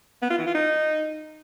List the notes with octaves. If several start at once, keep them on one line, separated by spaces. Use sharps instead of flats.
B3
F4
E3
F4
D#4